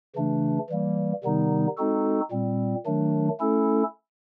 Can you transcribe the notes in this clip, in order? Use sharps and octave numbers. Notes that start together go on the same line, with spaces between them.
C#3 E3 A3 D4
E3 G3 A#3
C3 D#3 G3 B3 D#4
G#3 C4 D#4 F#4 A4
A#2 G3 C4
D#3 F#3 A3 D4
A3 C#4 E4 A4